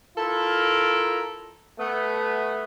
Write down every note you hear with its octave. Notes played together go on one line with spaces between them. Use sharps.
E4 F4 A4 A#4
A3 B3